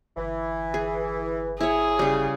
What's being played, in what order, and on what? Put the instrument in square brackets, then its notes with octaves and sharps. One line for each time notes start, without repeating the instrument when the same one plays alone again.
[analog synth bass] G1 [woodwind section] E3
[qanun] G#4
[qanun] E4 C#5 [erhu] G#4
[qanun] C#3 G3